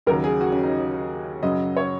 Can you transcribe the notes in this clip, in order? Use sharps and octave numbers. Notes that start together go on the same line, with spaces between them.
D#2 C#3 F#3 A#4
G#4
F#4
C#4
D#4
F#2 C#3 F#3 D#5
C#5